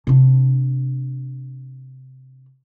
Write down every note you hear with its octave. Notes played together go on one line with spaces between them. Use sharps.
C3 D4